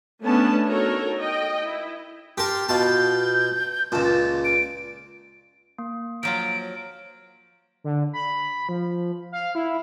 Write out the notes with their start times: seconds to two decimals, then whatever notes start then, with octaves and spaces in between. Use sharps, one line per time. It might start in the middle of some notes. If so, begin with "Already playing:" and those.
0.24 A3 B3 C#4 D4 A5
0.67 D#4 F#4 A4 A#4 C#5
1.19 D#5 G5
1.64 E4
2.38 G4 A#4 A5 C6
2.69 B2 F4 A5 G6
3.92 C#2 A#2 A5
4.04 A6
4.45 D7
5.78 A#3
6.23 F3 F#3 F4 D7
7.84 D3
8.13 B5
8.69 F3
9.32 F5
9.55 E4